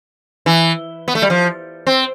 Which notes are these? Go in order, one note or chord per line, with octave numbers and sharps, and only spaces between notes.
E3
B3
A3
G3
F3
C4